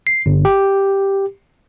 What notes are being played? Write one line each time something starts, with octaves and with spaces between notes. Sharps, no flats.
C7
G1
G4